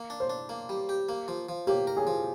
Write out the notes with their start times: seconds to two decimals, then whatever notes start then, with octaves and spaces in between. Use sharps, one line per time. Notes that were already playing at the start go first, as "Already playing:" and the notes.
Already playing: A#3
0.10 D4
0.20 C5
0.30 D4
0.49 A#3
0.69 G3
0.89 G4
1.09 A#3
1.28 F3
1.49 F3
1.67 A#3 G4
1.87 A#4
1.97 G#4
2.07 F3